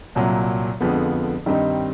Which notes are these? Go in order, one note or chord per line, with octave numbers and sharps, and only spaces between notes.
C2 A#2 F#3
F2 D3 F3 G#3 B3
G2 D#3 G3 C4 D#4